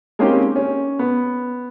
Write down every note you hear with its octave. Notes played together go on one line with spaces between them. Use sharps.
G#3 A#3 C4 C#4 D#4 G4
C#4
B3